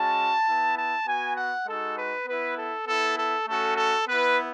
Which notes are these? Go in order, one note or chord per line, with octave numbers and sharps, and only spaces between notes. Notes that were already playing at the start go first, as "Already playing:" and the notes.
Already playing: G#3 C#4 F#4 A5
B3 E4
A5
B3 F#4 G#5
F#5
G#3 D#4 F#4 A4
B4
B3 E4 B4
A4
B3 E4 A4
A4
A3 C#4 F#4 A4
A4
B3 E4 B4